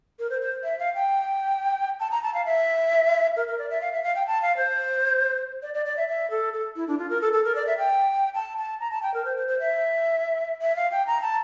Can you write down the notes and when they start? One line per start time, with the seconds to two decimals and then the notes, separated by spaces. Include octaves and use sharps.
0.19 A#4
0.30 C5
0.42 C5
0.64 E5
0.79 F5
0.95 G5
2.00 A5
2.11 A#5
2.23 A5
2.34 F5
2.46 E5
3.37 A#4
3.48 A#4
3.59 D5
3.70 E5
3.81 F5
3.93 E5
4.04 F5
4.16 G5
4.27 A5
4.42 F5
4.57 C5
5.62 D5
5.74 D5
5.86 D5
5.97 E5
6.08 E5
6.31 A4
6.53 A4
6.76 E4
6.88 D4
6.99 F4
7.10 A#4
7.21 A4
7.33 A4
7.45 A#4
7.55 D5
7.67 E5
7.78 G5
8.35 A5
8.58 A5
8.80 A#5
8.91 A5
9.03 G5
9.14 A#4
9.25 C5
9.37 C5
9.48 C5
9.60 E5
10.62 E5
10.76 F5
10.92 G5
11.07 A#5
11.22 A5